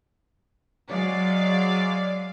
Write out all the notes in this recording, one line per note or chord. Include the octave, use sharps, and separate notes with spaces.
F#3 G#3 D5 F5